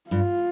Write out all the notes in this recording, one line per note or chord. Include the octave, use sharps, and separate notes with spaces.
G2 F4